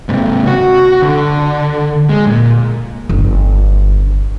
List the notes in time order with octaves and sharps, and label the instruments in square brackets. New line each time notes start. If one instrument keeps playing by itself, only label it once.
[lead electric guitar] G#2 C3
F#4
D3
G#3
A#2
[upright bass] G1